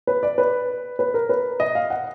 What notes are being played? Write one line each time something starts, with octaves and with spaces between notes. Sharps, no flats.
B4
D5
B4
B4
A#4
B4
D#5
F5
F#5